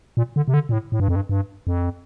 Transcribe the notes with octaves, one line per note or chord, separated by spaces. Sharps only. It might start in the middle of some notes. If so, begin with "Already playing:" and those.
A#2
D3
C3
D3
A#2
A2
A2
G2
F2
G2
G2
F2